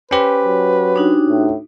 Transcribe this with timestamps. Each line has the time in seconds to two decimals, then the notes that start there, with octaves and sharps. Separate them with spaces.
0.11 C#4 G4 B4 C5
0.45 F#3
0.96 D4 D#4 F#4
1.29 A2